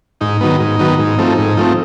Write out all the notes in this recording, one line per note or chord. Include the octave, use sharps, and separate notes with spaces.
G#2 D#4
D#3 F#3 B3
G#2
D#3 F#3 B3
G#2
F3 A3 C4
G#2
F3 A3 C4